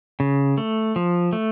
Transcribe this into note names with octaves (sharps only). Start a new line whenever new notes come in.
C#3
A3
F3
A3